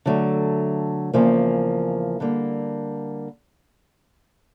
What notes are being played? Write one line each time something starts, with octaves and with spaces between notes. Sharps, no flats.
D3 F#3 A3
E2 C#3 F3 A#3
D3 G3 A#3